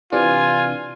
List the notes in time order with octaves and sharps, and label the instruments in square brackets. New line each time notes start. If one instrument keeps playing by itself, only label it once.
[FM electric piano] C3 E3 D4 [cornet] F4 [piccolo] G#5